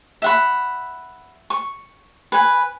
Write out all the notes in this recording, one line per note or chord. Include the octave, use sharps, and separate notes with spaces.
E5 F#5 B5
C#6
B4 G#5